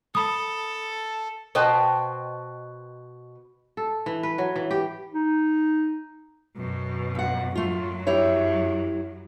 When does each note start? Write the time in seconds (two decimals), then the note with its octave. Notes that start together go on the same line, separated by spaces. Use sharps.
0.15 A4 B5 D#6
1.55 B2 B4 C5 D#5 G5 A5
3.77 A4
4.06 E3
4.23 B4
4.38 F#3
4.56 E3
4.71 G4
5.14 D#4
6.57 F#2 B2
7.15 F2 F#5
7.55 F#2 F#3 A3 F4
8.07 E4 G4 C#5